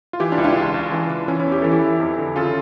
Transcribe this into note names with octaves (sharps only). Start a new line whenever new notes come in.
F4
E3 E4 G4
D4 F4
C#2
D4 F4
C#2
C#2
E3
E3
E3 C#4 E4
C#4 E4
E2
G4
E3 A4
E4 G4
E3
F2
D3
C#3 F4 A4